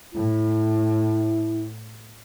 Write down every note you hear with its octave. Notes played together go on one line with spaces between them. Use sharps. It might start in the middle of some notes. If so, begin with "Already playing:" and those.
A2 E4